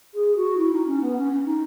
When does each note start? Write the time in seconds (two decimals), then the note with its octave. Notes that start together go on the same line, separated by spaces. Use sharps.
0.14 G#4
0.36 F#4
0.57 E4
0.72 D#4
0.87 C#4
1.01 B3
1.16 C#4
1.31 C#4
1.45 D#4